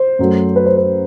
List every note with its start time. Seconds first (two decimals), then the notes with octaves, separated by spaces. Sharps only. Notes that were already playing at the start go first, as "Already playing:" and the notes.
Already playing: C5
0.19 F#2 F#3 A3
0.56 B4
0.66 C5
0.77 B4